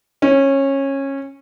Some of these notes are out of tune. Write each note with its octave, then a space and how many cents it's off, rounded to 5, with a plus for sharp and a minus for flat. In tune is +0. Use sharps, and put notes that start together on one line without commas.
C#4 -20